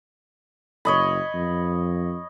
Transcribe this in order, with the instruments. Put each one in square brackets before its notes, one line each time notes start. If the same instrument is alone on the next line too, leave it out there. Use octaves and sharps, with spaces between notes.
[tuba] F#1 [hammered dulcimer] C#5 D#5 B5
[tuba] F2